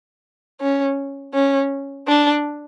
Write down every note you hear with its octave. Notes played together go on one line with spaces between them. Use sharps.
C#4
C#4
D4